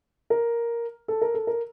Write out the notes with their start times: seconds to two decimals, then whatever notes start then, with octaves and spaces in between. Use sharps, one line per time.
0.30 A#4
1.08 A4
1.22 A#4
1.34 A4
1.47 A#4